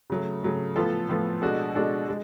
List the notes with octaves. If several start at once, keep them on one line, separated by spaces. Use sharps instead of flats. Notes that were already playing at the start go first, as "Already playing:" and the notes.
C#3 F#3 A3
C#3 F#3 A3
A2 F3 B3 F4 A4
A2 F3 B3 F4 A4
B2 G#3 D4 F#4 A4
B2 G#3 D4 F#4 A4
G#3